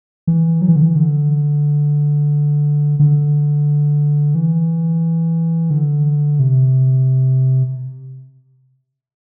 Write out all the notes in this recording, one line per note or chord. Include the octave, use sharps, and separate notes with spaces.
E3
F#3
E3
D3
E3
D3
D3
E3
D3
C3